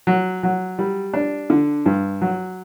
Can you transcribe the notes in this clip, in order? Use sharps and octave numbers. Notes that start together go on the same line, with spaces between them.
F#3
F#3
G3
D4
D3
G2
F#3